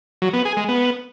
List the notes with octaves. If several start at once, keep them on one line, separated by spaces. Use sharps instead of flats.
F#3
B3
G#4
G#3
B3